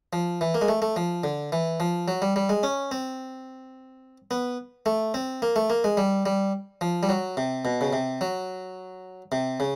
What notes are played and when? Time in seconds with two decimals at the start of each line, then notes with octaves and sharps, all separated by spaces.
0.13 F3
0.41 E3
0.54 A#3
0.61 G#3
0.68 A3
0.82 A3
0.96 F3
1.24 D3
1.52 E3
1.80 F3
2.08 F#3
2.22 G3
2.36 G3
2.49 G#3
2.63 C#4
2.91 C4
4.31 B3
4.86 A3
5.14 C4
5.42 A#3
5.56 A3
5.70 A#3
5.84 G#3
5.97 G3
6.26 G3
6.81 F3
7.03 G3
7.09 F#3
7.37 C3
7.65 B2
7.81 C#3
7.93 C3
8.21 F#3
9.32 C3
9.60 C#3